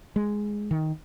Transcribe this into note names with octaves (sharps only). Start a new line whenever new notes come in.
G#3
D#3